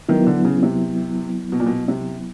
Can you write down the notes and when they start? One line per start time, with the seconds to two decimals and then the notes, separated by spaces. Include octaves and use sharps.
0.09 D#3 F#3 B3 E4
0.27 D3
0.45 C#3
0.63 C3
1.52 B2
1.60 A#2
1.66 B2
1.88 C3